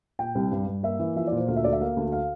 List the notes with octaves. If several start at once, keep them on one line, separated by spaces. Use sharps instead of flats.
A#2 G5
C2
G2
G2
A#3 E5
E3
F3 E5
D5
A#2
C5
D2 F5
E5
D2 D5
E5
A#3 F5
D2
F5